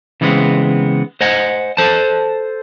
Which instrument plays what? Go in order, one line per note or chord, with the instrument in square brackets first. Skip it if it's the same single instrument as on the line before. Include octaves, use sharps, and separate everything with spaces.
[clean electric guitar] C#3 E3 G3 G#3 B3 C4
C5 D#5 F#5 G#5
A4 C5 A5